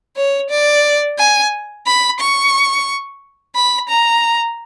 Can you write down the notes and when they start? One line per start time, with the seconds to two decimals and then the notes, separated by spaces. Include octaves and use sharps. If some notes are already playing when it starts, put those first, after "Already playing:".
0.16 C#5
0.50 D5
1.18 G#5
1.86 B5
2.20 C#6
3.55 B5
3.89 A#5